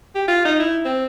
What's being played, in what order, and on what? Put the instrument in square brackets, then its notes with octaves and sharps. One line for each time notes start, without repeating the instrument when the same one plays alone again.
[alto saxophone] G4
F4
D#4
E4
C4